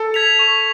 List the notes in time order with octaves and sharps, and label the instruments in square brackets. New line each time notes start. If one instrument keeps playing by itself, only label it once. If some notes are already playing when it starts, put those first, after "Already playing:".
Already playing: [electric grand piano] A4
[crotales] G#6 B6 F7
C#6